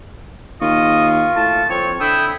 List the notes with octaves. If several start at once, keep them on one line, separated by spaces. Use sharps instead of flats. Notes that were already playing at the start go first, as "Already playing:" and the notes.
D#2 F4 D#5 C#6
A2 A5
F2 C4 C#5
D3 E4 G5 D#6 E6